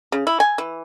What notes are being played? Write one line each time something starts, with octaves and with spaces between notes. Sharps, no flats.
C#3
E4
G#5
E3